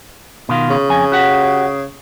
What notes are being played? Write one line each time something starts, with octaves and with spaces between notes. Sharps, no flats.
B2 D#3 F4
C#3
F2 G#5
F#4 G4 F#5